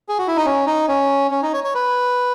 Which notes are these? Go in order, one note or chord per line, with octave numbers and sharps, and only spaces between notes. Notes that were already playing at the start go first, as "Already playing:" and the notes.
G#4
F#4
E4
D#4
C#4
D#4
C#4
C#4
D#4
C#5
C#5
B4